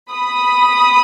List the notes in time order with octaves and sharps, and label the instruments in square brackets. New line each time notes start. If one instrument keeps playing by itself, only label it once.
[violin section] B5 D#6